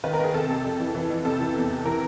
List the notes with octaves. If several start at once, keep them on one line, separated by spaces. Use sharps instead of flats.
D#3 B4
A#4
D#3 G#4
C3 A4
C3
F2
E3
E3
F2
C3 A4
E3
E2
C3
E3 A#4